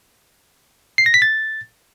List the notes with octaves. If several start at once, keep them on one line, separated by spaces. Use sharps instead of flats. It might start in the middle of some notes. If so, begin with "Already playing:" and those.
C7
A#6
B6
A6